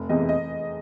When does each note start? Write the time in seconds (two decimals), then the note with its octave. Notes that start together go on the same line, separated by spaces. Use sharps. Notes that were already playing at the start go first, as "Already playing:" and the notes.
Already playing: F1
0.09 E2 C3 E3 D#5
0.29 D#5